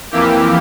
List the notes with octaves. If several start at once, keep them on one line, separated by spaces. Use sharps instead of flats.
F2 E3 A#3 E4 G4